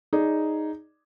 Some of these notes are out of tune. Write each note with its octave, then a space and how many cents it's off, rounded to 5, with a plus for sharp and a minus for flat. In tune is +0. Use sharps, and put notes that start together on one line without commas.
D#4 +0 G#4 +0 D5 +0